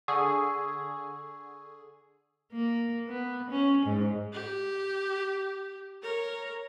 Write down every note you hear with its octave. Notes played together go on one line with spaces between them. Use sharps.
D3 G#4 C#6 E6 G#6
A#3
B3
C#4
G#2
G4
A#4 C#5